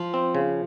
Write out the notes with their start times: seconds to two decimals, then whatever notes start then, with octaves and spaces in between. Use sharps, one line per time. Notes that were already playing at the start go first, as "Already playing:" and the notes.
Already playing: F3
0.14 C4
0.35 C#3